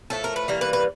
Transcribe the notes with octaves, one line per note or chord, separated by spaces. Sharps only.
A2 F3 A3 A4
A#4
B4
E3 G3 A#3 A#4
B4
B4